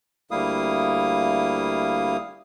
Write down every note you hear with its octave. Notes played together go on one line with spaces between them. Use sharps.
D2 G3 A#3 E4 F5 D#6